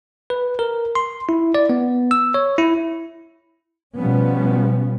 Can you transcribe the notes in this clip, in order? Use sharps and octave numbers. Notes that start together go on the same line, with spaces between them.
B4
A#4
C6
E4
D5
B3
E6
C#5
E4
B2 F3 G3 B3 C#4